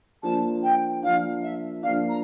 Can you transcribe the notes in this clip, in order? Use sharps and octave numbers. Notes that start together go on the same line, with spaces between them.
F3 A#3 D4 A5
G5
F3 A#3 D4 F5
E5
F3 A#3 D4 F5
A#5